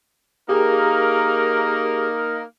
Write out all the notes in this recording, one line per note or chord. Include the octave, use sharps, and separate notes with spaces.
A#3 D#4 G4 G#4 A#4